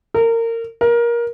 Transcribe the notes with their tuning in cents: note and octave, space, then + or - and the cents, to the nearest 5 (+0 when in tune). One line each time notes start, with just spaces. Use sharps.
A#4 -25
A#4 +20